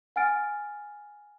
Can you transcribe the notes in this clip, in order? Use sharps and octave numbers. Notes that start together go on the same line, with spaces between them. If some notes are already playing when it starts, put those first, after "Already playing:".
F#5 G#5 F6 A6 D7